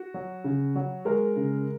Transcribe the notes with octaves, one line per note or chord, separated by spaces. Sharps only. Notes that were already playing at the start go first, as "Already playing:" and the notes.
Already playing: F#4
F#3
C#3
F#3
G#3 A#4
C#3